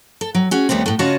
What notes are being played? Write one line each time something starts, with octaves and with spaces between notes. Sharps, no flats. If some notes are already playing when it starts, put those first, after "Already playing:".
A4
F#3
C#4 F#4 G#4
D#2 G3 A3 B3 C4
A2 A3
C#3 F4 F#4 C#5 D#5 A5